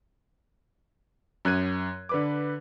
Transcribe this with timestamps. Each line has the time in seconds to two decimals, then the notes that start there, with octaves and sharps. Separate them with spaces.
1.45 F#2 F#6 G#6 D#7
2.09 D3 B4 D6